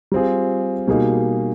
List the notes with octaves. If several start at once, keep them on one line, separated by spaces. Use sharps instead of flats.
G3 C4 F4 G#4
B2 G3 A#3 D#4 G#4